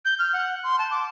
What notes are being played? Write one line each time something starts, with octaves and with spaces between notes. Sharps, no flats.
G6
F6
F#5
C6
A5
D6